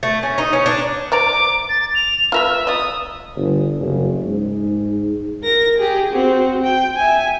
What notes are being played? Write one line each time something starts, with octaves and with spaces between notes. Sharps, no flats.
A3
C#4
D#4
C#4
D4
C5 D5 A#5 D6
A6
F7
F4 A#4 B4 E5
D5 D#5 D#6
G1
F#1
G#2
A#4 A#6
G4 G#4
C4 F#4
G5
E5 G#5